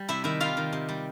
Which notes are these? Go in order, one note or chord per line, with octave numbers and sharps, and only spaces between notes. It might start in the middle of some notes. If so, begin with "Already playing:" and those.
Already playing: G3
C3 E4 E5
D#3 E4 E5
G3 F4 F5
D#3
C3
G3